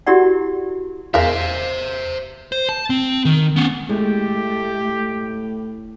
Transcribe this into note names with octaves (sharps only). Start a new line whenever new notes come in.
E4 F#4 G4 A#4 D5 F#5
E2 G#3 A#4 C5 E5 F5
C5
A5
C4
D#3
B3 C#4
A2 G#3 A3 G4